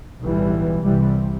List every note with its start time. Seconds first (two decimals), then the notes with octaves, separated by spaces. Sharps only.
0.20 B1 A2 E3 G3
0.84 C2 C3 E3 G3